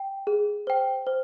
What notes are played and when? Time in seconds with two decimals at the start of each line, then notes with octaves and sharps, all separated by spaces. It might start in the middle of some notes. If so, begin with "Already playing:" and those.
Already playing: G5
0.27 G#4
0.67 C5 G5
1.07 C5